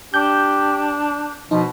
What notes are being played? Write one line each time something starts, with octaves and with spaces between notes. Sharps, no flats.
D4 G4 G6
B2 F3 D#4